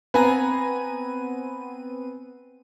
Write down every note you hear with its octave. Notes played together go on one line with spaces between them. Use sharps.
B3 C4 B4 G#5 A#5 D#7